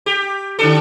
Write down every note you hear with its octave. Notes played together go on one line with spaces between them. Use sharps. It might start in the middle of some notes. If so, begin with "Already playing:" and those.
G4
D3 D4 A4